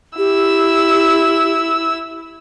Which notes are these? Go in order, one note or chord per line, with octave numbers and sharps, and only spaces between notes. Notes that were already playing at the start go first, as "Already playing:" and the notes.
E4 G4 E6